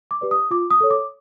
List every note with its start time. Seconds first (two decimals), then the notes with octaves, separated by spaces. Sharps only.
0.11 D6
0.21 G4 B4 D5
0.31 D#6
0.51 F4 D6
0.71 D#6
0.81 A4 C#5
0.90 D6